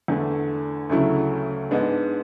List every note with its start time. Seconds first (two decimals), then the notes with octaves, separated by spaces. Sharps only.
0.08 E2 D3 A3
0.90 D2 C#3 F#3 A3 E4
1.71 G#2 G#3 B3 D4